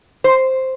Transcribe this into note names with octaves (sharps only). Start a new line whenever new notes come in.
C5